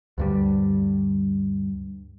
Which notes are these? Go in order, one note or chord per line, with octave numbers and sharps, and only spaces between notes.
D2 G2 G3